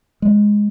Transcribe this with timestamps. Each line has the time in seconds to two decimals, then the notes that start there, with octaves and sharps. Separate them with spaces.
0.22 G#3